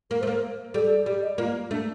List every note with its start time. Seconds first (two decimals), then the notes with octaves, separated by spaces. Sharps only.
0.11 A#3 A#4
0.21 A3 C5
0.27 A#3
0.31 A#4
0.74 G3 A4
0.85 A4
1.06 G3 G4
1.22 D#5
1.38 A#3 F4
1.71 A3 D4